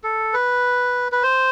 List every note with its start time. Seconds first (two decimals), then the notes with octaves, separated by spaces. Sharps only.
0.04 A4
0.34 B4
1.12 B4
1.23 C5